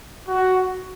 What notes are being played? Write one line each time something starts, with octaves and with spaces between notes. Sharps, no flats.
F#4